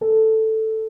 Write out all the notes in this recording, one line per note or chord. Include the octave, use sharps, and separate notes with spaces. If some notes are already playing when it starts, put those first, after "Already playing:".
A4